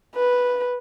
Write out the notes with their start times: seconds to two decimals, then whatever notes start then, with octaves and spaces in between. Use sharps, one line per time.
0.15 B4